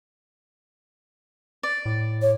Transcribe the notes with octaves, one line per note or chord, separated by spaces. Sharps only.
D5
A2
C#5